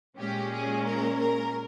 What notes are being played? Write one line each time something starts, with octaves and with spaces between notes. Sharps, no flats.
A#2 G#3 C#4 G4
G#4
A#4
A#4